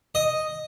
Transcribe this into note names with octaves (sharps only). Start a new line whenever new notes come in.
D#5